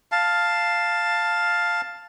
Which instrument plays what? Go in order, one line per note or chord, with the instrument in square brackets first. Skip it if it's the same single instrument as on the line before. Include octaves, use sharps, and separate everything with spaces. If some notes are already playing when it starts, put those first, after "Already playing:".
[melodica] F5 A5